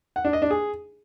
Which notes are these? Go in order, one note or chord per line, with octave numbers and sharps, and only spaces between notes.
F#5
D4
D#5
D4
G#4